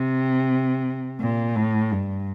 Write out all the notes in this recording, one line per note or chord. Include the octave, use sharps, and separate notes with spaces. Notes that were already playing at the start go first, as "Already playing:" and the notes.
Already playing: C3
A#2
A2
G2